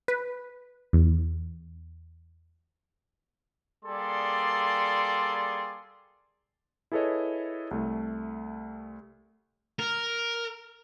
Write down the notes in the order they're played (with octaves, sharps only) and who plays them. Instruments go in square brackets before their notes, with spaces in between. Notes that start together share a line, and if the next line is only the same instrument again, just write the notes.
[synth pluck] B4
E2
[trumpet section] G3 A#3 G#4 A4 D5 C6
[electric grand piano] E4 G#4 A4 B4 C#5 D#5
C2 A3
[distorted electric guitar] A#4